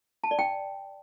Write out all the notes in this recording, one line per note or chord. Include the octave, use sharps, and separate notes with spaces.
A5
D5
G5